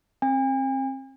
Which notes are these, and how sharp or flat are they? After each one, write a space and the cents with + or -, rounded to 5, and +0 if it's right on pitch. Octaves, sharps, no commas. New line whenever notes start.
C4 +30 G#5 -45